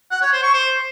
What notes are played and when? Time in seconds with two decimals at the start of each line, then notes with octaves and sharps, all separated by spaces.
0.11 F#5
0.22 C#5
0.33 C5
0.43 C#6
0.54 C5